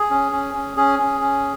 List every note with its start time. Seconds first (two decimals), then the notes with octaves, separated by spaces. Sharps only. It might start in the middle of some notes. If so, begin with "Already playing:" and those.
Already playing: G#4
0.11 C#4
0.32 C#4
0.54 C#4
0.77 C#4 G#4
0.99 C#4
1.21 C#4